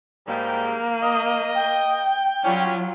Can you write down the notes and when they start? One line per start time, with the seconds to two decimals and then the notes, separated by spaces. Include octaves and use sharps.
0.28 G#2 G3 A#3 G5
1.03 D#5
1.54 G5
2.44 F#3 G3 C#4 F4